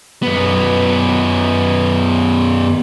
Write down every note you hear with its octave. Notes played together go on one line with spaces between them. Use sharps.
F#2 B3